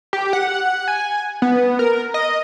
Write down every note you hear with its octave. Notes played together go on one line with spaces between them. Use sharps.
G4
F#5
G#5
B3
A#4
D#5